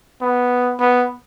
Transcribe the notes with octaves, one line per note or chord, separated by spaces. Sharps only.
B3
B3